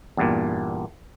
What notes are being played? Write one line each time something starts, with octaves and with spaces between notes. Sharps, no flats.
E2 G2 A#2